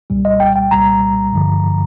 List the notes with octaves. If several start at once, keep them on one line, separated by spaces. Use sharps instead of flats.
C2 A#2 G3
D#5
G5
G5
C2 A#2 G3 A#5
G2 D3 F3